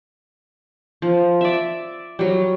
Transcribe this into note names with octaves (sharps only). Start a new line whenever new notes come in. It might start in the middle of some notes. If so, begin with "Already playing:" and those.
F3
D5 E5
F#3 G3